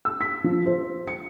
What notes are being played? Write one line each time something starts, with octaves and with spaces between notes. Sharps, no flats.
E6
B6
F3
C5
C#7